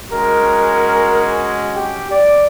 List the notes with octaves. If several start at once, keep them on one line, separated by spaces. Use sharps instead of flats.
G#3 C#4 F#4 A#4
G4
D5